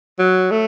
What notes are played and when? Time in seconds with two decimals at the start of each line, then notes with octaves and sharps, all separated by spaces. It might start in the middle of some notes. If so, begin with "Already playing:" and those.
0.19 F#3
0.51 A3